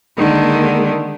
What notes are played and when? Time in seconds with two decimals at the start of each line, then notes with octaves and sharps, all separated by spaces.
0.18 D3 D#3 G#3 A#3